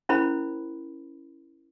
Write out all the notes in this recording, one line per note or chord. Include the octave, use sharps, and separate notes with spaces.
C#4 E4 A#4 C5 B5